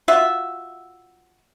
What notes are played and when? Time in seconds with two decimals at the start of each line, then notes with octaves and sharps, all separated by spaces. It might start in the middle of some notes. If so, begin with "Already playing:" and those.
0.08 F4 F#4 E5